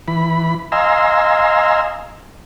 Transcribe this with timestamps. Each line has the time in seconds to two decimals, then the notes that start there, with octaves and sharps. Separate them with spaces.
0.08 E3 B5
0.72 D#5 F5 G#5 A#5 C6 E6